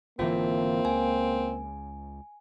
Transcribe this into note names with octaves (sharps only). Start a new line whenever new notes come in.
G#1 D3 E3 A#3 C4 F4 E5
C#2 G#5